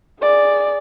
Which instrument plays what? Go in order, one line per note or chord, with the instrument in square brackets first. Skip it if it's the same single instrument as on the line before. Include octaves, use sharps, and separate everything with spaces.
[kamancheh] G#4 D5